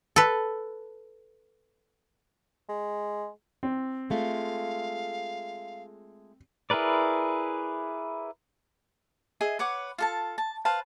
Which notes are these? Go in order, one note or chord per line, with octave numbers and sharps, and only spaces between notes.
A4 B4
G#3
C4
G#3 A3 F4 F5
E4 G#4 A#4 B4 D5
G#4 D#5 E5
B4 C#5 F#5 D6
F4 A4 A5
A5
B4 C5 F5 A5